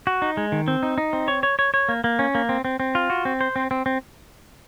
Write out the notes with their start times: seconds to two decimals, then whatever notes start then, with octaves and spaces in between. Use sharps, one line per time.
0.07 F#4
0.22 D#4
0.37 G#3
0.52 D#3
0.68 C4
0.83 D#4
0.98 D#4
1.13 C4
1.28 C#5
1.43 C#5
1.59 C#5
1.74 C#5
1.89 A#3
2.04 A#3
2.19 C#4
2.35 A#3
2.49 C4
2.65 C4
2.80 C4
2.95 F4
3.10 F#4
3.25 C4
3.41 C5
3.56 C4
3.71 C4
3.86 C4